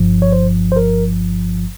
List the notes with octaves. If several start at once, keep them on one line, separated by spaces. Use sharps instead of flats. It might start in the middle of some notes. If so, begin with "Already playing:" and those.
Already playing: G1 G2 F3
C#5
C5
C5
A#4